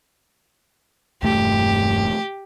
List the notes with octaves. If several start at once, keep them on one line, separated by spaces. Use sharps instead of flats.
E1 G2 A3 G4